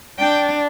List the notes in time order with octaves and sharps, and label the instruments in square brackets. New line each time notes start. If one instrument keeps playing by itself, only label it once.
[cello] D4 [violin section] G5